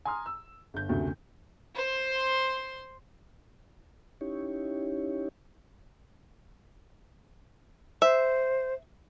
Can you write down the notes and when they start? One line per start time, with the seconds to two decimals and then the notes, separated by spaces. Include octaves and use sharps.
0.05 G#5 A#5 C6 D#6 F6
0.26 E6
0.74 G1 G6
0.89 F#1 D2 C3 A3 F#4
1.75 C5 C6
4.21 C#4 D#4 E4 G4 C#5
8.02 C5 E5